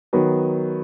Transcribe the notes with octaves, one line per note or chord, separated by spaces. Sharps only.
D#3 F#3 B3